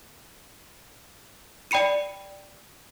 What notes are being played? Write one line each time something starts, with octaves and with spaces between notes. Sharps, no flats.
D5 G5 B5 C#7 D#7